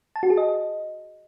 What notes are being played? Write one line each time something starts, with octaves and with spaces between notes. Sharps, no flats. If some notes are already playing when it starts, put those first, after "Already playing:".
A5
F#4
G#4
D#5